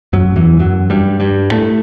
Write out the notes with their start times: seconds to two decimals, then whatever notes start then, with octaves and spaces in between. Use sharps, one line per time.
0.13 F#2 F#3
0.36 E2 E3
0.59 F#2 F#3
0.90 G2 G3
1.20 G2 G3
1.51 A2 A3